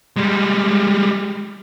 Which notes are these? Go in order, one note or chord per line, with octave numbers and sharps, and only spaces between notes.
G3 G#3